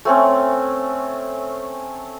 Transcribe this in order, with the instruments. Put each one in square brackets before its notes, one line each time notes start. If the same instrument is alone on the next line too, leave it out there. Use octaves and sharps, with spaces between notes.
[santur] A3 C4 C#4